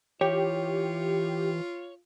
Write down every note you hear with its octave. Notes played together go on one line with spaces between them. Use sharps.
E3 F4 G4 C#5